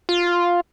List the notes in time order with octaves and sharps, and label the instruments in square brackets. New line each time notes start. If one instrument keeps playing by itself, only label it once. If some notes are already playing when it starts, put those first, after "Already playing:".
[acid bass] F4